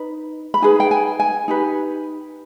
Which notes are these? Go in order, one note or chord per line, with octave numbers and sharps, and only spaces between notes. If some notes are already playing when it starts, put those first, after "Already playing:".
Already playing: D#4 B4
B5
D#4 G#4 B4 G#5
G5
G#5
G#5
D#4 G4 B4